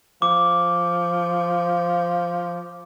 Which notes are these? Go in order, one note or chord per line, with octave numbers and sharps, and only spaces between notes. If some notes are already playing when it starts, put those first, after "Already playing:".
F3 D6